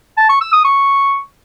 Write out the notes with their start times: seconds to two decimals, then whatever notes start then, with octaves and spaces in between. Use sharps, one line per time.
0.18 A5
0.29 C#6
0.41 E6
0.53 D#6
0.65 C#6